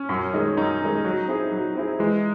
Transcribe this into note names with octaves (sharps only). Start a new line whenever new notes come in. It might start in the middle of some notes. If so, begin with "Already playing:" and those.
Already playing: C#4
F#2
D#3 G#3
F#2 D#4
D#3 G#3
F#3
C4 E4 G#4
F#3
C4 E4 G#4
E3 G#3